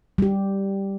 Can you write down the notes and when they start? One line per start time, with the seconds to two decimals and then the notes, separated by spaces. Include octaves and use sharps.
0.18 G3 G4